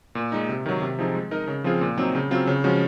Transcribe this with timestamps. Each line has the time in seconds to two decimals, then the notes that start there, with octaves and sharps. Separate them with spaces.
0.15 A#2
0.32 G#3 D#4
0.49 C3
0.66 D#3 F#3
0.82 C3
0.99 F3 C4 D#4 G#4
1.15 G#3
1.31 D#4 A#4 D#5
1.48 C#3
1.64 F3 C4 F4 G#4
1.81 A#2
1.98 F#3 C4 D#4
2.15 C#3
2.31 F#3 C4 F4
2.47 C#3
2.64 F3 G#3 C#4 F#4